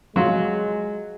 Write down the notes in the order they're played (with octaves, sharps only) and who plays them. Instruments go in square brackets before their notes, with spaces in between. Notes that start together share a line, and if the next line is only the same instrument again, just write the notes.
[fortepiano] F#3 F4 F#4 [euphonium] G#3